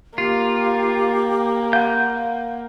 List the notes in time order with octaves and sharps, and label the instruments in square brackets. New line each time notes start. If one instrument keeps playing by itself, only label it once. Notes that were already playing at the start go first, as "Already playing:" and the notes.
[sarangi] A#3 [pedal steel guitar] F4 [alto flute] G4
[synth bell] F5 F#5 [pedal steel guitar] G6